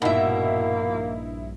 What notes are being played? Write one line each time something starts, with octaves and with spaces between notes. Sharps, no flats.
A#1 G2 B2 A#3 D#4 E4 E5